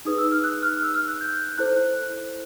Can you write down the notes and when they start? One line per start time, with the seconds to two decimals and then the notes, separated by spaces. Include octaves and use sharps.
0.05 D#4 G#4 B4 D#6
0.18 E6
0.32 F6
0.44 F#6
0.62 F6
0.76 F6
0.83 E6
0.94 F6
1.08 F#6
1.21 G6
1.58 E4 A4 C5 F#6